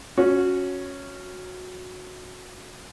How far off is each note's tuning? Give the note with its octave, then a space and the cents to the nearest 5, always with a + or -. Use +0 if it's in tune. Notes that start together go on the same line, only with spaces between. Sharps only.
C#4 +0 F#4 -15